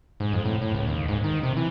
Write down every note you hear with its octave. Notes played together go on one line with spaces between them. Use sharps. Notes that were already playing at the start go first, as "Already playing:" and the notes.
G#2
F2
A2
A2
C#2
D#2
G#2
D#3
C3
E3